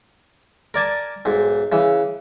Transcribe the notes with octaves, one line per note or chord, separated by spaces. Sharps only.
A#4 D5 G#5 A5
B1 G#2
C#3 E3